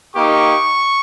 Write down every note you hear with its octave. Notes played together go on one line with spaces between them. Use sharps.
A#3 D#4 G4 C#6